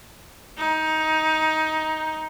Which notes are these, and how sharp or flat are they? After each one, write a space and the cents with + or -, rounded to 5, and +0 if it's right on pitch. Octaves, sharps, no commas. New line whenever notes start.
D#4 +15